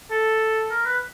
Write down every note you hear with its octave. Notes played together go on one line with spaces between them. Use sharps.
A4
A#4
B4